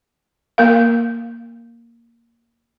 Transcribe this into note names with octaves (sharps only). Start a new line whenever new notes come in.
A#3 A#4 F5